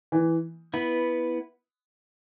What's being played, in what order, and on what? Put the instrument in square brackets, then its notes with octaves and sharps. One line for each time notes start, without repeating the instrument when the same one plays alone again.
[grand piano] E3
[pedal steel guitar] B3 E4 B4